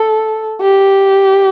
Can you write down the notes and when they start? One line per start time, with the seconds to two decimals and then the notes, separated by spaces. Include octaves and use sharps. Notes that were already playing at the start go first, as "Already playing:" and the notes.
Already playing: A4
0.61 G4